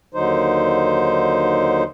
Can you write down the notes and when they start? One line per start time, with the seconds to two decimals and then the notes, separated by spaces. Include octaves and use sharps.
0.14 D#2 D3 F#3 D#4 C5